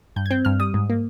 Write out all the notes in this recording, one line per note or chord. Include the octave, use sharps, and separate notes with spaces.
G2 G6
G#6
C4 G6
G2 F6
G3 D#6
G#2
A#3